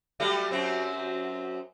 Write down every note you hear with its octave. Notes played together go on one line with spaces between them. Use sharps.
F#3 G3 A3
F#2 F#3 C4